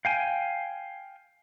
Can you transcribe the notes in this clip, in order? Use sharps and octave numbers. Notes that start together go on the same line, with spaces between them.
F5 G5 G#5